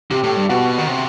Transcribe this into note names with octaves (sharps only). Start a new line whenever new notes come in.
C3 G4
A2
G2
B2 F#4
D#3
C3